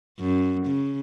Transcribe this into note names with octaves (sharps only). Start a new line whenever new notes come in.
F#2
C#3